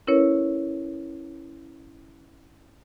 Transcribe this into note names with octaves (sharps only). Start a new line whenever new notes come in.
C#4 E4 A#4 B4 C#5